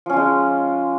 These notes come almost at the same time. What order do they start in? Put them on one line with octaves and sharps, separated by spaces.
F3 C#4 F4 G#3